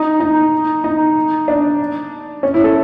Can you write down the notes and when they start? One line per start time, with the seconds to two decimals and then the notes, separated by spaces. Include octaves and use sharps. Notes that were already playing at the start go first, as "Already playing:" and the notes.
Already playing: D#4
0.20 D#4
0.84 D#4
1.48 D4
2.43 C#4
2.54 E4
2.64 A4